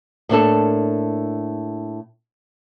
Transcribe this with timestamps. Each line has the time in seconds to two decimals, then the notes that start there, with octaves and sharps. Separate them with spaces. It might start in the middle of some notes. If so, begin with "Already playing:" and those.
0.29 A2 A#3 D4 A4